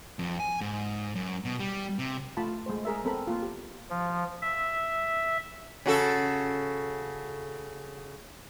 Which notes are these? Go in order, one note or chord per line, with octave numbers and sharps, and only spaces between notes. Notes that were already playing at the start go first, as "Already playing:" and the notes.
F2
G#5
G#2
F#2
B2
G3
C3
A3 F4 A5 B5
G#3 A3 C5
G#4 A#4 E5
B3 C4 A4 A#4 B5
A#3 F4
G4
F3
E5
C#3 F#4 A4